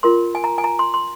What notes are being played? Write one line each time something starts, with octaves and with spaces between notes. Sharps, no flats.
F4 A#4 C6
G#5
A#5
G#5
A#5
C6
C6